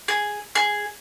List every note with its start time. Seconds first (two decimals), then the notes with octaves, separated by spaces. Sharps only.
0.08 G#4
0.55 G#4